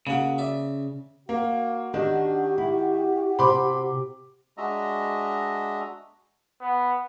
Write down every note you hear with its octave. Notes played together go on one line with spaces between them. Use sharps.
C#3 A#3 F#4
D5 E5
A#3 F#4 F5
D#3 D4 G4 D#5 A5
E4
C3 B5 C6 D6
G#3 D4 F#4 D#5 E5 A#5
B3